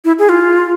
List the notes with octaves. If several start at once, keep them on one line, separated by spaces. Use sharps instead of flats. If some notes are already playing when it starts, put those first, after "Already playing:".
E4
G#4
F4